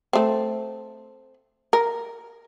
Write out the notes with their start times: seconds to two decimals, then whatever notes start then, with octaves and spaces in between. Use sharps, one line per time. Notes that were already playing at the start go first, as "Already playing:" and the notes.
0.13 A3 C4
1.73 A#4